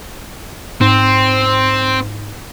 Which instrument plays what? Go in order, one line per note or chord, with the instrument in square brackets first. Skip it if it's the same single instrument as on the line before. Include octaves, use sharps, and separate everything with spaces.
[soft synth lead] G#2 [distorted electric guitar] C4